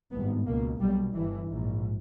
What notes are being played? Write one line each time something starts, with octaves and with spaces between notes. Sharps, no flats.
G#1 G2 B3
C#2 B2 A#3
B1 B2 G3
G1 G2 E3
A#1 G#2